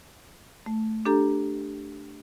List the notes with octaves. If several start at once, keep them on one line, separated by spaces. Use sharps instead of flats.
A3
D4 G4 A4 A#5